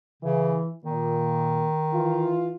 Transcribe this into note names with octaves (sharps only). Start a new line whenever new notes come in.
C#3 E3
A#2 D#3
E3 F4